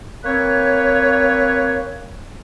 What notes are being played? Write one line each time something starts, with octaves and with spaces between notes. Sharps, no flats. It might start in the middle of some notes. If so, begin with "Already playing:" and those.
A#3 C4 B4 C#5